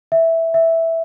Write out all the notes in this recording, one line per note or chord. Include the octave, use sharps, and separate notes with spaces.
E5
E5